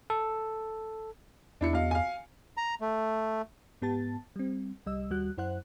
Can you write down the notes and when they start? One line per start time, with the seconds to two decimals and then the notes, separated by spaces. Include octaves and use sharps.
0.10 A4
1.61 E2 D4 E4 C#7
1.73 B1 F5
1.91 F5 G#5
2.57 A#5
2.81 A3
3.82 G#2 B3 G4 A5 A6
4.36 G3 C4
4.86 C2 G3 D#5 E6
5.10 D#2 G3 F#4 F#6
5.37 F#2 E4 C5 F#5 F#6